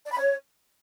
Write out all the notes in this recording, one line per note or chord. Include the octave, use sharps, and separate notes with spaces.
D5
B5
C#5